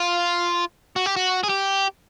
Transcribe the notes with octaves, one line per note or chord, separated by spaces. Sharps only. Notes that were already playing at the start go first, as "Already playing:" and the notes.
Already playing: F4
F#4
G4
F#4
G#4
G4